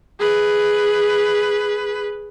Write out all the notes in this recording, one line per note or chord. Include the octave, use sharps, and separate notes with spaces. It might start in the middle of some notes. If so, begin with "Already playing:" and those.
G#4 B4